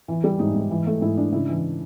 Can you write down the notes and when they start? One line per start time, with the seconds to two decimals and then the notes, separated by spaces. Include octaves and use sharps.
0.08 E3
0.24 G3
0.39 G#2 D#4
0.55 G#2
0.71 E3
0.87 A3
1.01 G#2 E4
1.17 D4
1.33 C#3 E4
1.49 E3